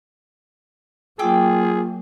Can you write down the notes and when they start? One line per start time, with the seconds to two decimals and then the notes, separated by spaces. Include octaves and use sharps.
1.19 F#3 A#3 F4 G#4 G5 D6 E6